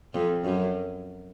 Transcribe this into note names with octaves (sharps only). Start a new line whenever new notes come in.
F2
F#2